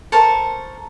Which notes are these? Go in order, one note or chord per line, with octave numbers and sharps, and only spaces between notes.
A4 A#4 C5 C#6